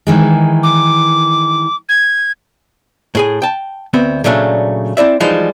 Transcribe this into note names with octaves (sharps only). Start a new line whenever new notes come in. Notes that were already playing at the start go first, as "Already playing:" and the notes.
D#3 E3 G#3
D6
G#6
A2 G#4 G#5
G5 A5
D2 B3 C4
A#2 C#3 F#3 A3 D4
C4 E4 D5 E5
E3 F3 G3 G#3 D#4